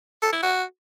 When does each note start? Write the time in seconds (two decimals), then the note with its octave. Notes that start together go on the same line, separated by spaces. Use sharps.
0.22 A4
0.32 E4
0.43 F#4